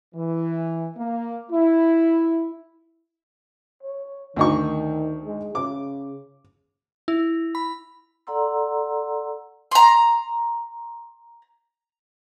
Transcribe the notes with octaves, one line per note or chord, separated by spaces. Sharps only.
E3
A#3
E4
C#5
D2 D#3 D#4 C#6
G#3
C#3 D6
E4
B5
A4 D5 F#5 A#5 C6 E6
A#5 C6